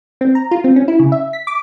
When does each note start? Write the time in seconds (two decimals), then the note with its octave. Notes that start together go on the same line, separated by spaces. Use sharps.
0.21 C4
0.35 A#5
0.51 F4
0.64 C4
0.76 C#4
0.88 E4
0.99 C#3
1.12 E5
1.33 B6
1.47 D6